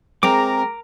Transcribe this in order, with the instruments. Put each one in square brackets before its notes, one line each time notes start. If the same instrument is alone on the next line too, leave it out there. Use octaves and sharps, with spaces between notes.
[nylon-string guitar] G#3 C4 [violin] A#4 [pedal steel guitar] A#5 D6